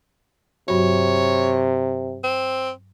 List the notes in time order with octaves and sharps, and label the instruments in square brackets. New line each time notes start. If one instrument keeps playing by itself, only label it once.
[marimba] G2 F#3 F#4 [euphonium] C3 [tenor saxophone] C#5
[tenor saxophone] C4